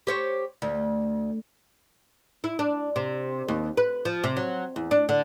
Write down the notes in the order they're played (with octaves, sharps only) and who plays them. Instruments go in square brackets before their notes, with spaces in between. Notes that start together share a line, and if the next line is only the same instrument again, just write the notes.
[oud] G4 C5 C#5
D2
E4
D4
C3
D#2
B4
F3
C3
F#3
E2
D4
D3